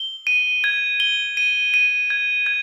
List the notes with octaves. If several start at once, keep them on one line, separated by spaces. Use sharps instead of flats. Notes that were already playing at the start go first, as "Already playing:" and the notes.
Already playing: G7
D#7
G#6
G7
D#7
D#7
G#6
G#6